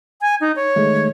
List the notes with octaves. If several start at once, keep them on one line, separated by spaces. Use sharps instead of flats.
G#5
D#4
C#5
D#3 G#3 A3